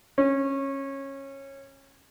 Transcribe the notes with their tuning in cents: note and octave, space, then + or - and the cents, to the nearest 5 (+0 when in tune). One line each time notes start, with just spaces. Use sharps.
C#4 -20